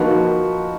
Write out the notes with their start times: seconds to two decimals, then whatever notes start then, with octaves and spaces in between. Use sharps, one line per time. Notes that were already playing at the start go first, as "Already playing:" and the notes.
Already playing: F3 A#3 D#4 F#4 B4